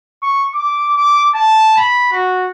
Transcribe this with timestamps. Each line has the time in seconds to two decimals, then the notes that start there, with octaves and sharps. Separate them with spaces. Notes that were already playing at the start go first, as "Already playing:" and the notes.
0.22 C#6
0.54 D6
0.95 D6
1.35 A5
1.77 B5
2.12 F#4